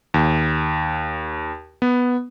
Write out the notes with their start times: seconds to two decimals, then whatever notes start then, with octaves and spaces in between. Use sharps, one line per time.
0.14 D#2
1.82 B3